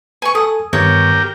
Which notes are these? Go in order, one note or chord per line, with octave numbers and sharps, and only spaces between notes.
B4 G#5 C#6
A4 G#5 D#6
G2 D#3 B3 G4 A#4 C#5